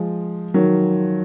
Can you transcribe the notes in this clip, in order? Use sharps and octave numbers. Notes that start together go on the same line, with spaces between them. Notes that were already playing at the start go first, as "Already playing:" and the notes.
Already playing: F3 G#3
D#3 F#3